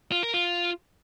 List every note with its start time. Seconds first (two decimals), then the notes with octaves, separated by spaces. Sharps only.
0.12 F4
0.23 A#4
0.34 F4